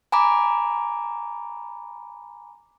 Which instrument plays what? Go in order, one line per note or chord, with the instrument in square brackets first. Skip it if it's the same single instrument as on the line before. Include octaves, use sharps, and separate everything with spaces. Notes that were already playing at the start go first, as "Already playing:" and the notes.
[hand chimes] G#5 A#5 B5 D6